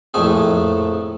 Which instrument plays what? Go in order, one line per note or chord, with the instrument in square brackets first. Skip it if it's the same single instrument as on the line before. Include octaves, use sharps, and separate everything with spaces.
[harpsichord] A#1 F2 A2 A3 G#4